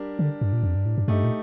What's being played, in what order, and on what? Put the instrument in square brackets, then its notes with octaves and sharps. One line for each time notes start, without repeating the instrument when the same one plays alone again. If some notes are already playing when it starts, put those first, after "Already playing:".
Already playing: [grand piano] G3 D4 G4 A#4
[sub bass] D3
G2
A#2
F2
G2
A2
G2
[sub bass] G2 [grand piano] A3 D#4 G4
[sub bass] A#2